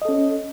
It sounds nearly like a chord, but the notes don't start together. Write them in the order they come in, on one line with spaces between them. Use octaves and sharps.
D#5 A4 C#4